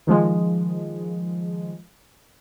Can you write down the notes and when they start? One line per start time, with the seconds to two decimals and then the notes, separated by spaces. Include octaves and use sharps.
0.07 D#3 F3 G#3